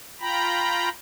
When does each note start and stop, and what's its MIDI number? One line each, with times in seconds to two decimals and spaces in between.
0.20 0.89 65
0.20 0.89 79
0.20 0.89 82
0.20 0.89 83